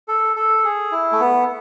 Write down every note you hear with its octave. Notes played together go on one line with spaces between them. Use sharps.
A4
A4
G#4
E4
A3
B3